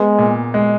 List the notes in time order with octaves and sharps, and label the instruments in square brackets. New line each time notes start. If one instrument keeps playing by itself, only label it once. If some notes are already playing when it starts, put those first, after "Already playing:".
Already playing: [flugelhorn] G#3 [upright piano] B3
[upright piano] A#2
G#3